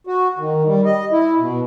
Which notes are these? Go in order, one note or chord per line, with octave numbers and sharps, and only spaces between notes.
F#4
D#3
G3
D#5
E4
B2